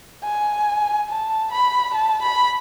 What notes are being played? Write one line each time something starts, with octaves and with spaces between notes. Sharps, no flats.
G#5
A5
B5
A5
B5